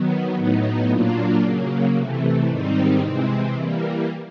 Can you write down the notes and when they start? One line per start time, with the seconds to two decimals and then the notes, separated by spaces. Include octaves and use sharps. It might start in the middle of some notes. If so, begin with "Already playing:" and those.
Already playing: D#3 F#3 B3
0.38 A2 F#3 B3 D#4
0.90 A#2 F#3 A#3 D4 F4
1.43 C#3 F#3 A#3
1.95 C3 E3 A3
2.48 G#2 D#3 G3 C4 D#4
3.02 C3 E3 G#3 C4
3.55 E3 G3 A#3